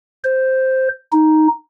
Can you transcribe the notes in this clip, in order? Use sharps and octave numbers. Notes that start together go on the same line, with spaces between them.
C5
D#4